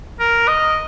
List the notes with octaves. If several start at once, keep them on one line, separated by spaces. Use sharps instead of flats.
A#4
D#5